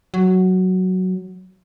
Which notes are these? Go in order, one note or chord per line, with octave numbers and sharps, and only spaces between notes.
F#3